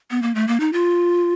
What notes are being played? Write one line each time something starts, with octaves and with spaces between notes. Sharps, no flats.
B3
A#3
A3
A#3
D#4
F4